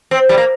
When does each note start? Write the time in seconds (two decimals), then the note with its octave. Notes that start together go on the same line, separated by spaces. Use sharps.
0.11 C4
0.29 G3
0.37 A#3